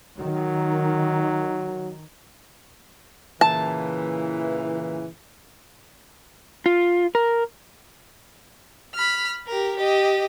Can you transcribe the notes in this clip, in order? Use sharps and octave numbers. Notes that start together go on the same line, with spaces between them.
D#3 F#3
A#2 C#3 E3 A5
F4
A#4
B5 F6
G4 A#4
G4 D#5